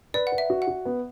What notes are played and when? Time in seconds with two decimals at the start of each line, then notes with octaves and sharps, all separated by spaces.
0.14 B4 D5
0.27 F#5
0.32 B4
0.38 E5
0.50 F#4
0.62 F#5
0.68 F#4
0.85 B3